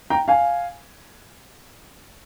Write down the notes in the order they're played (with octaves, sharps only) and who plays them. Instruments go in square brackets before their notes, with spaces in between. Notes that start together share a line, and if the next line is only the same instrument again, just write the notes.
[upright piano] G5 A#5
F5 G#5